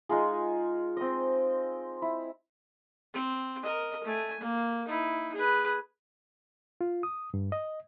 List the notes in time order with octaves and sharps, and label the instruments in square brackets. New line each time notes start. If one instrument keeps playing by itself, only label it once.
[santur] G#3 D#4 F4 G#4
C4 D#5
E4
[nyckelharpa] C4
A#4 D#5
A3 G#5
A#3
D#4 E4
G#4 B4
[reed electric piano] F4
D#6
G2
D#5